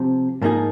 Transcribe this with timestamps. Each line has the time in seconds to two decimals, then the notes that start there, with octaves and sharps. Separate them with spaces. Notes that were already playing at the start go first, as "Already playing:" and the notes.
Already playing: C3 F3 C4
0.42 G#2 F3 A#3 D#4 G#4